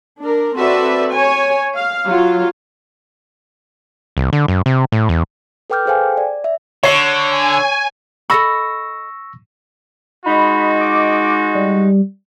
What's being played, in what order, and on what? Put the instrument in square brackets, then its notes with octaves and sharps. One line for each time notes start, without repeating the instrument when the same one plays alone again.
[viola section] D4 A#4
C4 F#4 A4 B4 D5 E5
C#5 G#5
F5
F#3 F4 F5
[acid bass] C2
D3
F#2
C3
A2
E2
[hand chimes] A4 B4 G5 D6 F6 G6
G#4 A4 C5 F5 G5 G#5
D5
E5
[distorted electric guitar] D3 [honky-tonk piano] C#5 C7
[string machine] G#5
[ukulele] A4 D#5 B5 [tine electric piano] C#6 E6 A#6
[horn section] G#3 D#4 F#4 [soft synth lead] B5
[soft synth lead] D6
G3